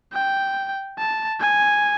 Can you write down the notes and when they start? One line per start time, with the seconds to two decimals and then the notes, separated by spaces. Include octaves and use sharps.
0.13 G5
0.98 A5
1.40 G#5